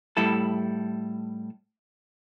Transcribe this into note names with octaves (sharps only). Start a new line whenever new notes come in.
A2 G3 E4 A4